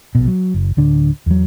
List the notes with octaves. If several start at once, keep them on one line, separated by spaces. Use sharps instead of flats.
A#1 B2
F#3
F#1
D1 D3 D4
E2 F#3